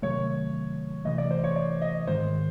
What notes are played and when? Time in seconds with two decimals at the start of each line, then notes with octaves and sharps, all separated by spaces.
0.02 C3 D#3 F#3 A3 C#5
1.05 C3 E3 A3 D#5
1.18 D5
1.31 C5
1.44 C#5
1.56 D5
1.82 D#5
2.07 G#2 D#3 G#3 C5